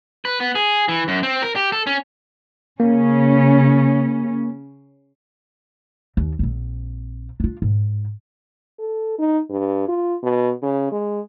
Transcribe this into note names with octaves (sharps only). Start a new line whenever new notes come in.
B4
B3
G#4
E3
F#2
C4
A#4
G4
A4
C#4
C#3 A#3 C#4
D#2
A#1 C4
D4 F4
G#2
A4
D#4
G2
F4
B2
C#3
G#3